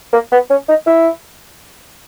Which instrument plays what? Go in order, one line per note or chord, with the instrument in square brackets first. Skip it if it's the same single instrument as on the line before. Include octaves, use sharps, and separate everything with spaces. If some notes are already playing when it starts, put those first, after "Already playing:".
[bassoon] A#3
B3
C#4
D#4
E4